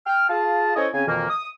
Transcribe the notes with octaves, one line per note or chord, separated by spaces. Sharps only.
G5 F6
F4 G#4 F5 A5
C#4 E4 A4 C5 C#5 D#5
C#3 C4 C#4 G#5
F2 B2 D#3 E3 A#3
D#6